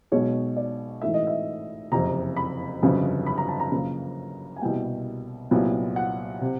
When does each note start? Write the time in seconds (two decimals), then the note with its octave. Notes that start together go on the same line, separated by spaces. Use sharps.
0.12 B1 B2 G#3 B3 C#5
0.57 D5
1.02 A1 G#2 E3 A3 E5
1.14 D#5
1.27 E5
1.92 F#1 F2 C3 A#5
2.36 B5
2.82 G1 F2 C#3 F#3
3.26 B5
3.38 A#5
3.49 A5
3.60 A#5
3.72 F#2 C#3 F3 A#3
4.56 G#5
4.61 C2 B2 G3 A#3 G5
5.51 C2 A#2 F#3 B3
5.96 F#5
6.41 C3